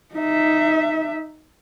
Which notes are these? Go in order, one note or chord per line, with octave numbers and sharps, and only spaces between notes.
D#4 E5